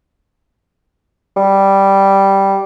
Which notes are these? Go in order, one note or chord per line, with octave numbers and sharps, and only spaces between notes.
G3